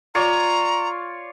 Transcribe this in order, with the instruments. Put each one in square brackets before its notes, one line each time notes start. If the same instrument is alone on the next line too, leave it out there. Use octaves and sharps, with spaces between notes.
[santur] F4 C#5 D5 [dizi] A#5